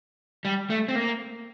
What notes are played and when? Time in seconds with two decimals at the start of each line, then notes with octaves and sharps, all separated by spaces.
0.45 G3
0.70 A3
0.88 C4
0.95 A#3